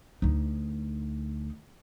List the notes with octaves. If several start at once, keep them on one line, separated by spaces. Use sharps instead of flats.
D2 D#4